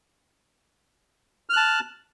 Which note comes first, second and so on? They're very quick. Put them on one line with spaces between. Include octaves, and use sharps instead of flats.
F6 F#6 A5